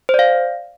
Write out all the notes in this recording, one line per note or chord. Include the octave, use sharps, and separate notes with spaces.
C5
D5
F5